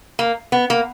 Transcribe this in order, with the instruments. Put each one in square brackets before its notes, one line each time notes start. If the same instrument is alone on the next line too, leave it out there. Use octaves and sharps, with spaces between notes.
[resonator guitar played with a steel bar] A#3
B3
A#3